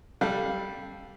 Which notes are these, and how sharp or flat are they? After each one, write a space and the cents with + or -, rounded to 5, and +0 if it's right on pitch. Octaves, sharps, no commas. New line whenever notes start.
G3 +0 A4 +0 F5 +0